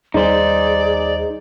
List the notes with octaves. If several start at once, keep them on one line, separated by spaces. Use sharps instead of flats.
D#2 G3 D#4 G#4 C5 D5